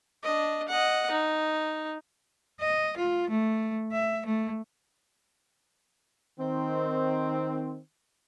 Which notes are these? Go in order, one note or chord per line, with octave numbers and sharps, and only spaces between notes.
D4 D#5
D#5 F#5
D#4
D#5
F4
A3
E5
A3
D#3 C4